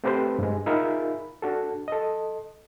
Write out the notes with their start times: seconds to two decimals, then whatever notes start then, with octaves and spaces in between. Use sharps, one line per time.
0.04 A3 C4 G4 B4 C5
0.39 G2 G#3
0.66 D#4 F4 G#4 A#4 E5 B5
1.42 D4 F#4 A4
1.88 A4 D#5